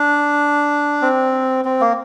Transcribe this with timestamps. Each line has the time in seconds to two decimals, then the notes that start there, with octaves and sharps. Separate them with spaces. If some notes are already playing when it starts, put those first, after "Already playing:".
Already playing: D4
1.02 C4
1.65 C4
1.81 A#3